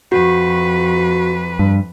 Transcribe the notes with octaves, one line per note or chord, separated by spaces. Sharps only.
F2 F#4 B4
G2